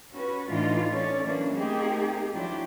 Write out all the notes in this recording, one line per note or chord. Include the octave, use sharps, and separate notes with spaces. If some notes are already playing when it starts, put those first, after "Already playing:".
C#4 F#4 B4
A2 E3 A3 D4 D#4 F4
C#4 A4 C#5 D5
E3 F#3 A#3 C#4 D4
A3 A#3 C4 D#4 G4 G#4
F3 F#3 D4 E4 F#4 G4